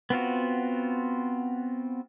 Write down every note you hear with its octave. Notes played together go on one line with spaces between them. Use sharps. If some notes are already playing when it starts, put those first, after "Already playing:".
B3 C4 F4 F#4